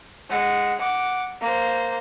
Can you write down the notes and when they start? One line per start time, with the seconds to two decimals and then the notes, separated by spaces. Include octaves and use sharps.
0.30 G#3 F#5
0.79 F#5 D6
1.41 A#3 C5